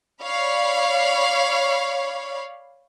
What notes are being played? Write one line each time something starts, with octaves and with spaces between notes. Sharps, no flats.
C#5 D5 F5 B5